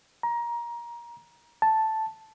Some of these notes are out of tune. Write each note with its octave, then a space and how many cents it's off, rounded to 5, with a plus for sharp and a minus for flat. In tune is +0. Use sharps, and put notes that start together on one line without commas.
A#5 +20
A5 +0